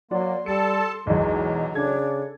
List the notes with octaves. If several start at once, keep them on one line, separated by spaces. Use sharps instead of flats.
F#3 A#3 F#4 D5 C6
G3 A4 A5 C#7
B1 E2 F#3 G#3
C#3 D4 A4 G#6